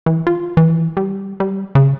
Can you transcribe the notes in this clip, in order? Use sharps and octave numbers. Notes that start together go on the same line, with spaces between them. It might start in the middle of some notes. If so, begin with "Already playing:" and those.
E3
F4
E3
G3
G3
C#3